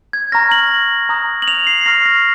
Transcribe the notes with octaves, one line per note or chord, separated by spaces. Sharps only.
G#6
A#5 C#6 F6 A#6
F#7
A#5 D#6 F#6
F#7
F7
C7
C7
A#5 C#6 F6 A#6
A#6